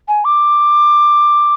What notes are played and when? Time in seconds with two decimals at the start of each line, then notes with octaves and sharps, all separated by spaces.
0.08 G#5
0.25 D6